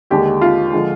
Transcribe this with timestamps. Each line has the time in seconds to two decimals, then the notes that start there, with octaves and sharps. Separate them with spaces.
0.10 D#2 D3 G#3 G4
0.41 F4
0.73 D3 F3 G#3